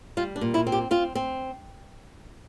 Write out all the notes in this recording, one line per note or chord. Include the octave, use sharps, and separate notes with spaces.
G3 F4
D4
A#2
E4
C4
G4
C4 F4
C4